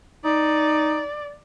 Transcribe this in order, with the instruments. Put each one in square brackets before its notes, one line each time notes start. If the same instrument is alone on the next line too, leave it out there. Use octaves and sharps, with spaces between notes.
[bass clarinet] D#4 [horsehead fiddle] D5